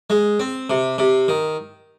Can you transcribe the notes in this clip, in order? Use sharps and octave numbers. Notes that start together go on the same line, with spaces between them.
G#3
C4
C3
C3
D#3